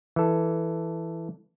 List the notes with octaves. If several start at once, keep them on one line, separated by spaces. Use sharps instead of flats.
E3 A4